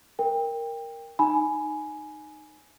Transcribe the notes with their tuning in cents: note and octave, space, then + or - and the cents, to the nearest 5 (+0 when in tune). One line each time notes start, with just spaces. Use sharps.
A#4 +0 G5 +20
D#4 -15 G#5 +10 B5 +0